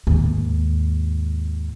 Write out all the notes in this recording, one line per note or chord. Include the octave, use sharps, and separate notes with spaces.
D#2 G#2